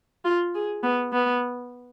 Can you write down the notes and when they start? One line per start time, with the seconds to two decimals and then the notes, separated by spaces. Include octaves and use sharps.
0.25 F4
0.55 G#4
0.83 B3
1.13 B3